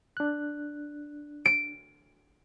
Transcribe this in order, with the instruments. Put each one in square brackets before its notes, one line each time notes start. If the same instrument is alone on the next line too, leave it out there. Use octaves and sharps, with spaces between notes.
[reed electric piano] D4 F#6
[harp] D7